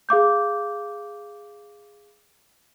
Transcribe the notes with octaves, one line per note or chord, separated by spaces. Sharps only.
G#4 F5 D6 G6